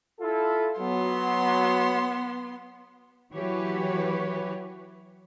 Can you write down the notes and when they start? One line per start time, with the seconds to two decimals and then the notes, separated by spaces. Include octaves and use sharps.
0.20 E4 F4 A4
0.79 F#3 B3 C6
3.32 E3 F#3 F#4 G4 B4 C#5